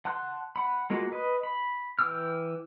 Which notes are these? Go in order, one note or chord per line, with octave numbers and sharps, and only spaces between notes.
F#5 A5 C6 F#6
F#5 B5
G#3 A#3 F4 F#4
B4 D#5
B5
E3 G5 D6 E6 F6